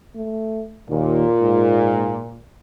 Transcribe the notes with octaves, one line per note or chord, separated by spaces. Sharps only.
A3
D#2 A#2
G#2